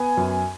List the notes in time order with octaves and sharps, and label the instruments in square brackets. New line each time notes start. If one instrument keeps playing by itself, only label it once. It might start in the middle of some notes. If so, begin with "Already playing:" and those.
Already playing: [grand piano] B3 G#5
F#2